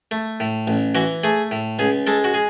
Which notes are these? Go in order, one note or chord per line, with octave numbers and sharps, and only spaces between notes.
A3
A2
A1
E3 F#4
A3 G#4
A2
C#2 G#4
G#3 A4
F#4
G#4